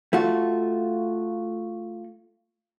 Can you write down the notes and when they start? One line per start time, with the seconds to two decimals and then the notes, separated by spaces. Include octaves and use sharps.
0.13 A3 F4 F#4